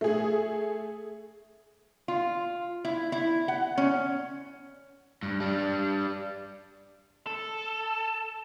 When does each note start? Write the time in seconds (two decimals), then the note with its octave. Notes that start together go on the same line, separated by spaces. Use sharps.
0.01 A3 G#4
2.08 F4
2.85 E4
3.12 E4
3.48 F#5
3.78 C#4
5.23 G2
5.40 G3 D4
7.26 A4